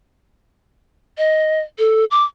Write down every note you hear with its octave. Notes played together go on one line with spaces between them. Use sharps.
D#5
A4
D6